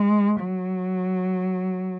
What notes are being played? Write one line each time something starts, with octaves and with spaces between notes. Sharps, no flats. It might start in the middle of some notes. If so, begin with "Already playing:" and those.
Already playing: G#3
F#3